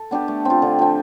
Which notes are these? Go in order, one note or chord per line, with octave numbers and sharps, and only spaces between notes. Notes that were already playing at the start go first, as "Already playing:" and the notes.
Already playing: A4
B3 D4 G4
A3
C4 F4
D3
F3 C4